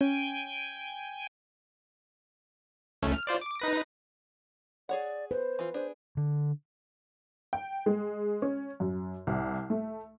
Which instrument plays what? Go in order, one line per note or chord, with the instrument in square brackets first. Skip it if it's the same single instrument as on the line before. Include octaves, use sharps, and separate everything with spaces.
[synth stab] C#4 [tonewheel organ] G5 G#5
[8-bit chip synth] C#2 A3 C#4
F6
F4 C5 D5
D6
D#4 B4 A#6
[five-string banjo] G#4 C#5 F#5 [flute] D5
[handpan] B4 [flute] C5
[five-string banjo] E3 F4
[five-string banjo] D4 G#4 [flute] C5
[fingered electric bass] D3
[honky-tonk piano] G5
G#3
C#4
F#2
C2
A3